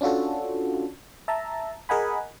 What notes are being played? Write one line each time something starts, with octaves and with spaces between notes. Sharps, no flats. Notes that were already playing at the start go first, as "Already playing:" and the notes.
C#4 D4 F4 F#4 A4
E5 A5 A#5
G#4 A#4 D#5 F#5 G#5 B5